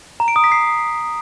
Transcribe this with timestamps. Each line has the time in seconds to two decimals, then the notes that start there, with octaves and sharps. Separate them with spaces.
0.20 A#5
0.28 D7
0.36 D#6
0.44 B6
0.52 C7